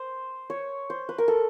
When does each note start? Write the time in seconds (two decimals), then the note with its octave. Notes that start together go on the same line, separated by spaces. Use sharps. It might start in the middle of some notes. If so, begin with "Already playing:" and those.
Already playing: C5
0.50 C#5
0.90 C5
1.09 B4
1.18 A#4
1.28 A4